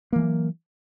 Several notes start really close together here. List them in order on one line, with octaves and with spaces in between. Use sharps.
A#3 E3 A3 F#3